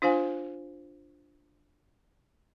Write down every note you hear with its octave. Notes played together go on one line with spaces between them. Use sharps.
D4 F4 C5 F5 G#5